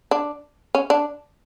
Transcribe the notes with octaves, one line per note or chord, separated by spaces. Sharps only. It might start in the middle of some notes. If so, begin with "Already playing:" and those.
D4
C#4
D4